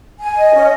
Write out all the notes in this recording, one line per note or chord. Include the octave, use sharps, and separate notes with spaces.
G#5
D#5
C#4